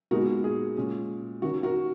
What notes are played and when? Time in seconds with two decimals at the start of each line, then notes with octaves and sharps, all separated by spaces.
0.11 A#2 G#3 B3 D#4 F#4 A#4
0.44 G#4
0.76 A#2 G#3 C#4
1.42 D#3 A#3 C#4 F#4
1.63 F#4 A#4